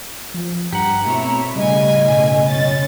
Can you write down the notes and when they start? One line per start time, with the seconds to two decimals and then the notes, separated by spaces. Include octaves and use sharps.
0.34 F3
0.73 G2 G4 F#5 A#5
1.06 B2 A3 C4 E4 C#5
1.56 A2 C#3 G3 D#5 G#5
2.09 B2
2.48 F#2 C#4 A6